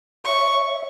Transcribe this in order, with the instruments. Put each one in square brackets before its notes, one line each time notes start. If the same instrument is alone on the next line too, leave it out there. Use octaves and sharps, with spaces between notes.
[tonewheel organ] C#5 E5 [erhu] C#6